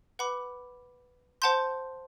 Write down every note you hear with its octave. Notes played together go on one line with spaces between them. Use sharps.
B4 F#5 B5 D6
C5 F#5 A5 C6 G6